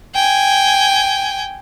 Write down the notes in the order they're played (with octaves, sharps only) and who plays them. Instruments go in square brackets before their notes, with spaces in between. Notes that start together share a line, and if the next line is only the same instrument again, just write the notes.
[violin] G5 G#5